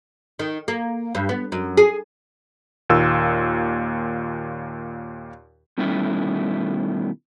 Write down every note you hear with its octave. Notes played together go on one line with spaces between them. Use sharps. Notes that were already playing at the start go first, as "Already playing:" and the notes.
D#3
A#3
G2
B3
F#2
G#4
D#2 A#2 E6
B2 D#3 G3 A3 C#4 E4